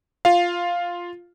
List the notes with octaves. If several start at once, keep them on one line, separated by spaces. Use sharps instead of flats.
F4 F5